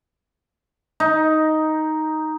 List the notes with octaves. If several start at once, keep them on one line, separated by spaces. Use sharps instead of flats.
D#4